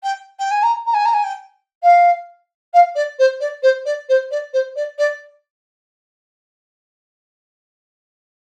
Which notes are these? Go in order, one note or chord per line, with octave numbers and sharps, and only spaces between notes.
G5
G5
G#5
A#5
A#5
G#5
A#5
G#5
G5
F5
F5
D5
C5
D5
C5
D5
C5
D5
C5
D5
D5